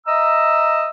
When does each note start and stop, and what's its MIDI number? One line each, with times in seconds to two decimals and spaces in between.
0.07 0.89 75
0.07 0.89 76
0.07 0.89 82
0.07 0.89 88